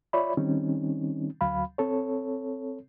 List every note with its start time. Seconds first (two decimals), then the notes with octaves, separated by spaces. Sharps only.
0.13 F4 C#5 D5 E5 B5
0.37 D#3 G3 C4 C#4 D#4
1.41 D2 F#3 F5 B5
1.78 C4 A4 C#5